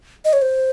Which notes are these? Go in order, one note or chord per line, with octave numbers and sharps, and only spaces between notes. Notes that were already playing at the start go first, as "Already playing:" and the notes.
D#5
C#5
C5